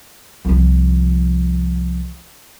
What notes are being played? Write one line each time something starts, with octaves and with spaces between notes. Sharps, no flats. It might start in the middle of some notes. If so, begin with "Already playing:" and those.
C2 F3